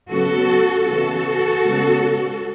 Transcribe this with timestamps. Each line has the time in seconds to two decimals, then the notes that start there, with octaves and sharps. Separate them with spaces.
0.11 C#3 F#3 B3 F#4 A4
0.87 C#3 E3 B3 F#4 A4
1.64 C#3 G#3 B3